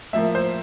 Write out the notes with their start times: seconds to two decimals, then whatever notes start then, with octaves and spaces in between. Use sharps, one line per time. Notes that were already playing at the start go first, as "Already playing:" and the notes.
0.13 A2 F3 A#3 E5
0.35 C5